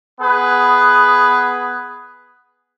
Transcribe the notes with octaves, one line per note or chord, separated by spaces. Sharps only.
B3 G#4 B4